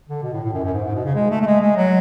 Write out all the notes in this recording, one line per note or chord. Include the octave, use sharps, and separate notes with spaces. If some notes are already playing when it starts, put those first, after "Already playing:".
D3
B2
A2
A2
F#2
F#2
G#2
G#2
B2
C#3
G#3
A3
A3
G#3
G#3
F#3